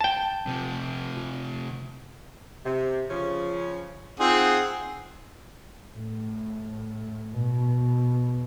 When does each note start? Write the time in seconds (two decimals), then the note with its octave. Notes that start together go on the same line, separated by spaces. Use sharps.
0.01 G5 A5
0.48 C3 F3
2.65 C3
3.09 C#3 F3 C#4
4.20 C4 D#4 F4 G#4 F#5
5.95 A2
7.38 B2